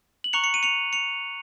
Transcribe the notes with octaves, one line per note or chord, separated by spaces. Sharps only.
F#7
A#5 C#6 F#6 C#7 F7
C#7
D#7
C#7 F7
C#7 F7